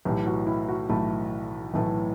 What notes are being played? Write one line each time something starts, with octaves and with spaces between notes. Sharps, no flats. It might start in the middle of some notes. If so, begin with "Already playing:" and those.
B1 A2 E3 A3 G4
F#4
E4
F#4
B1 A2 E3 A3 E4
B1 A2 E3 A3